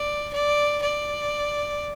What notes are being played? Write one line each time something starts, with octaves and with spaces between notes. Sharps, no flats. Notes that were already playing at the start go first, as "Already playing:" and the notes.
Already playing: D5
D5
D5